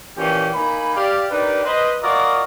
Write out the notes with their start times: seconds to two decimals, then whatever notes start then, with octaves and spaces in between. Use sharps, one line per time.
0.17 A#2 E3 F3 C#4 G4
0.54 A#3 D#4 G#5 B5
0.95 G4 D5 F5
1.31 D4 D#4 G4 A#4 B4 D5
1.64 B4 C5 D#5
2.02 F4 F#4 A#4 D5 D#5